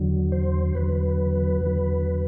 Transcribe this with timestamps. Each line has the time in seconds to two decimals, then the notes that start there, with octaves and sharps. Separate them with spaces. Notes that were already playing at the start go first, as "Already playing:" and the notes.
Already playing: E2 D3 F#3
0.32 C5
0.75 E2 D3 F#3 B4
1.61 E2 D3 F#3